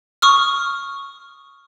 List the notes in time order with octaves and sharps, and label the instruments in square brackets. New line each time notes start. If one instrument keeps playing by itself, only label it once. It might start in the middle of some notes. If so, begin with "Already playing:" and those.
[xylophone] C#6 D#6 F6